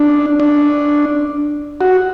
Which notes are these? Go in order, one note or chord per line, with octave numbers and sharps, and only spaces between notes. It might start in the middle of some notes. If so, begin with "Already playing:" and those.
Already playing: D4
D4
F#4